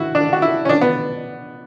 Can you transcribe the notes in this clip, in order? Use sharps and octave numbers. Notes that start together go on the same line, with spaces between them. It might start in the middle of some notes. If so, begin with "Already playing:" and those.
Already playing: E4 F#4
D4
F#4
E4
C#4
D4
B3